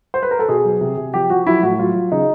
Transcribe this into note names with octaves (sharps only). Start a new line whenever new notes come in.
C5
B4
A#4
A4
B2 G#4
F#3
C3
C3
F3 G4
F3 F#4
F#3 E4
A2 F#4
F#3 F4
F#3
C#3 D#4